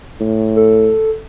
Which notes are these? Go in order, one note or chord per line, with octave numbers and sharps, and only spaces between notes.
A2
A4